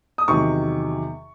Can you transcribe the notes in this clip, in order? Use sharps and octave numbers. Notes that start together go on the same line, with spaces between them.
D#6
E2 C3 D#3 F#3 C#6